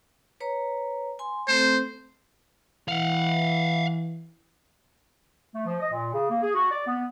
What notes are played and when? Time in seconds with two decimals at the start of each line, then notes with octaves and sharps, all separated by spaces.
0.40 B4 C#5 A#5
1.19 G#5 C6
1.48 A3 C4 A4 C5
2.88 E3 F5 F#5
5.54 A3
5.66 F3
5.81 D#5
5.92 A#2
6.13 C#3
6.30 A#3
6.42 G#4
6.54 F#4
6.71 D5
6.87 B3